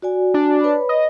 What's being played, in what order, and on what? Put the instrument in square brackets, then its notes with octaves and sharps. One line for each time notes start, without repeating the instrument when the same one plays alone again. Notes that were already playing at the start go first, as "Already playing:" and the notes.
[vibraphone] F#4 D5 G#5
[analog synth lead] D4
[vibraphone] B4 C#5 B5
[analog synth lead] D#5